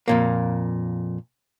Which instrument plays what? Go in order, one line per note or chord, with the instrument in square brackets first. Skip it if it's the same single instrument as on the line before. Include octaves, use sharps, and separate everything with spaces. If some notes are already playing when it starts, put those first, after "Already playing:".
[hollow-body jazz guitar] F2 A#2 A#3